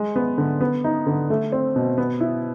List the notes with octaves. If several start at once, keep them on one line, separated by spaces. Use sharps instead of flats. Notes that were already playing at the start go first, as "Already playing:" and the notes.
Already playing: G#3
B3
D3
B3
D#4
D3
A3
C4
B2
B3
E4